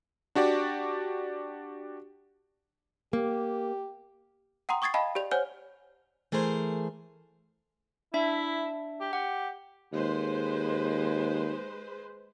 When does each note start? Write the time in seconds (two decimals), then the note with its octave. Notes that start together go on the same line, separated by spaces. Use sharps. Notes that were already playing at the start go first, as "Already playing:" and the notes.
0.35 D4 F#4 G4 D5
3.13 A#3 G4
4.69 F#5 G5 A#5 C6 D#6
4.82 C#6 D#6 G#6 A6 C7
4.94 D#5 F5 G5 A5 B5
5.15 G4 D5 F7
5.31 C5 C#5 F#5 G#5 F6 G6
6.32 E3 A3 G#4 A#4 C5
8.14 D4 E4 E5
9.00 G4
9.13 G4 F#5
9.92 D#2 G#3 B4 C5